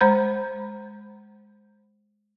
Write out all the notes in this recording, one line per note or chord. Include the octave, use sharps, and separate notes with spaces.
G#3 C5 A#5 B5 G6